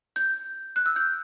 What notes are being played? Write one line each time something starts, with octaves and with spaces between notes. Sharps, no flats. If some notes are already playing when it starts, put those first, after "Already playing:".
G6
F#6
E6
G6